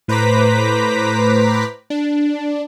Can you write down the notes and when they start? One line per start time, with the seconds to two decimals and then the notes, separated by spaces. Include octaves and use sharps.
0.08 A2 B4 C5 A#5 D6 B6
1.90 D4